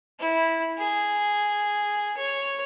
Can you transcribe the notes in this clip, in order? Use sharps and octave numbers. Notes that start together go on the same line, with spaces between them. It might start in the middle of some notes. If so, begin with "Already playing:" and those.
E4
G#4
C#5